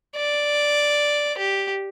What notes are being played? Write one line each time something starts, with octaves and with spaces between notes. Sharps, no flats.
D5
G4